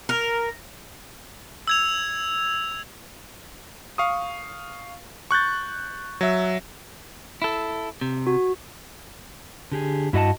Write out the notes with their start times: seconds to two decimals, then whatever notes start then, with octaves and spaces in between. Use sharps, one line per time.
0.09 A#4
1.67 E6 G#6 F7
3.98 F5 C#6 D#6
5.31 C#6 F#6 G6 A6
6.21 F#3 E5
7.42 E4 A4
8.01 C3
8.27 F#4
9.72 D3 G4 G#4
10.13 G2 E4 F#4 D#5 F#5 A5